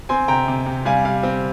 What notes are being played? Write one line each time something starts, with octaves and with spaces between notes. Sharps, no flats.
C4 G#5 C6
C3 G5 A#5
C3
C3
G3 F5 G#5
G3 F5
C4